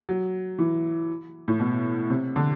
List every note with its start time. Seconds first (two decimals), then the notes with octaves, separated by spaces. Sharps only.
0.09 F#3
0.59 E3
1.48 A2
1.60 B2
2.10 C3
2.36 D3